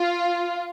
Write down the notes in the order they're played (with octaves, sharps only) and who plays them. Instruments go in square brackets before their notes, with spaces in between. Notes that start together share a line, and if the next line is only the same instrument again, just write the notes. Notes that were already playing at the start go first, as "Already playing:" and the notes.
Already playing: [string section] F4